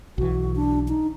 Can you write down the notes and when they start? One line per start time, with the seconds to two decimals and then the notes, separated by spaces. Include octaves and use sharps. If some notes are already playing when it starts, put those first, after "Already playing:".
0.18 B1 E3 F#4
0.56 D4
0.88 D#4